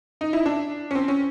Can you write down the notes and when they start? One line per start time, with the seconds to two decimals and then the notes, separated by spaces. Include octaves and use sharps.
0.21 D#4
0.33 E4
0.46 D4
0.91 C#4
0.95 C4
1.08 C#4